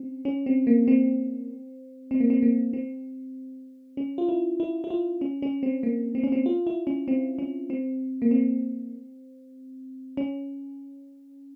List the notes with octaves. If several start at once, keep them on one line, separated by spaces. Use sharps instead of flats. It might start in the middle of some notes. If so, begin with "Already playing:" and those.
Already playing: C4 C#4
C#4
C4
A#3
C4
C4
A#3
C4
A#3
C4
C#4
F4
E4
E4
E4
F4
C#4
C#4
C4
A#3
C4
C#4
C4
F4
E4
C#4
C4
C#4
C4
A#3
C4
C#4